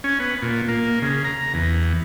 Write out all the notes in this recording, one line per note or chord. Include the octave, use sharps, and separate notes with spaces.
C#4
B3
A#2
A#3
C#3
A#5
E2